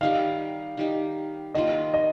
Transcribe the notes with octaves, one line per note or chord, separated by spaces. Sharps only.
D#3 G3 D#4 G4 F5
D#3 G3 D#4 G4
D#3 G3 A#3 F4 D#5
D#5